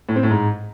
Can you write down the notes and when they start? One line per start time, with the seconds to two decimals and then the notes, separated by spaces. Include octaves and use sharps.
0.09 A2
0.16 C4
0.23 A2
0.31 G#2